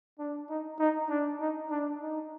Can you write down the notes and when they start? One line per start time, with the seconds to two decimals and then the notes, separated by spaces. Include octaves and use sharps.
0.19 D4
0.50 D#4
0.79 D#4
1.10 D4
1.40 D#4
1.71 D4
2.02 D#4